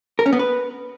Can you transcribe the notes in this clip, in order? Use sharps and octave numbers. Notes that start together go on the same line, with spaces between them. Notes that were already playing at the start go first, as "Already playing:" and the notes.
A#4
C#4
B3
B4